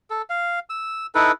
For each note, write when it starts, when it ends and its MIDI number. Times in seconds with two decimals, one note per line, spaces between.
0.10 0.22 69
0.30 0.59 77
0.70 1.07 88
1.15 1.32 63
1.15 1.32 64
1.15 1.32 69
1.15 1.32 71